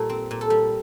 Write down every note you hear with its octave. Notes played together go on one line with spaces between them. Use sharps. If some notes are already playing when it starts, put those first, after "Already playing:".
Already playing: A#2 G3 A4
C4
A#2
A4
G3